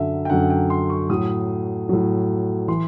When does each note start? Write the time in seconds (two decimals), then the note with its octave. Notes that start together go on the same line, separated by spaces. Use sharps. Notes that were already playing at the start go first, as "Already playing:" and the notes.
Already playing: F#2 D3 F#3 E5
0.25 G5
0.30 F#2 D3 F#3 F#5
0.50 G5
0.70 C6
0.90 C#6
1.10 A2 F#3 D#6
1.89 A2 F#3
2.68 E3 C6